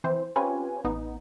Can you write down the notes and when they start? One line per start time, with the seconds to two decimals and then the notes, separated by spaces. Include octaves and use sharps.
0.04 E3 C4 C5
0.36 C4 C#4 F4 G4 B4 G#5
0.84 A1 B3 D#4